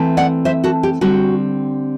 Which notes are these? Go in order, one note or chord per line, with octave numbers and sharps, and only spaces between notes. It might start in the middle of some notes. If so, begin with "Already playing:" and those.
Already playing: E3 A3 C4
D5 F#5
C5 E5
F#4 A4
G4
D3 G3 C4 F#4